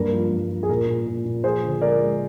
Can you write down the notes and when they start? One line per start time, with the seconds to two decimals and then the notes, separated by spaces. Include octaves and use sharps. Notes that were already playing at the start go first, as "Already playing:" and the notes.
Already playing: G2 A#3 A#4
0.13 F3
0.31 G2
0.50 F3
0.63 G#4
0.69 A#2 A#4
0.87 A#2
1.06 A#2
1.25 A#2
1.44 F3 G#4 C5
1.63 D3
1.81 G#3 A#4 D5
2.00 G#3